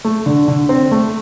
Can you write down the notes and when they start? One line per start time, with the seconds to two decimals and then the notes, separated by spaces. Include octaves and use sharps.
0.04 A3
0.26 D3
0.48 D3
0.69 C4
0.91 A3